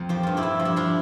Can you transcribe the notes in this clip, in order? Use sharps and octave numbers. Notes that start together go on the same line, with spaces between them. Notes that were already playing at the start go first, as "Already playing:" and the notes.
Already playing: F2
F3 G4
G2 F4
E4 G4
G2
F3
E4
F3 D4 F4